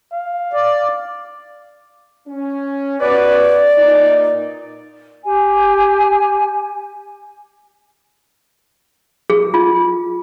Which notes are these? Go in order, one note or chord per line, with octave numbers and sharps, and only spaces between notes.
F5
D5
C#4
B3 F#4 B4 D5
A#2 D#4
G4 G#5
G#4
F4